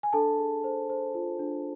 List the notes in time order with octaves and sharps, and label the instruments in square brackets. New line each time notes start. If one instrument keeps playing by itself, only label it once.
[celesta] G#5
D4 A4 A5
G#4
C5
C5
F4
D4